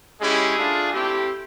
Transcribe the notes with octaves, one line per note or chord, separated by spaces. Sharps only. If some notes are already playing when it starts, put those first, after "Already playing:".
G#3 C#4 E4 G4 G#4
A3 D4 F4
A3 C4 E4 G4